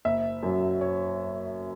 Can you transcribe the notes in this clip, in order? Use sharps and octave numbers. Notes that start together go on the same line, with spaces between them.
F#1 E5
F#2 F#3
C#5